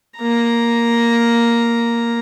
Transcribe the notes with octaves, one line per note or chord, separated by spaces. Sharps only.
A#3 A#5